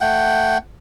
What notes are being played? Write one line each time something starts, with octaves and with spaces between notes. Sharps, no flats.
A3 F#5 G5